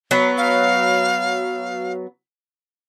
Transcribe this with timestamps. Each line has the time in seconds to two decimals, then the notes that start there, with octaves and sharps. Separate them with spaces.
0.11 F#3 B3
0.38 F5